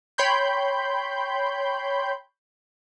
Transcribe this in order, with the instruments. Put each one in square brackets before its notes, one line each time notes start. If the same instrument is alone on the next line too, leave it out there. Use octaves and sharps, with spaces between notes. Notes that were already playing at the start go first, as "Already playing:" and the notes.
[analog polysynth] C#5 G5 B5 C6 G6